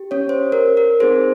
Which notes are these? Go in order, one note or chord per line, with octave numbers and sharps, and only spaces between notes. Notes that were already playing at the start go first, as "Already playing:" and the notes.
Already playing: G4
C#4 C#5
C5
A#4
A#4
C4 D#4 G#4 C5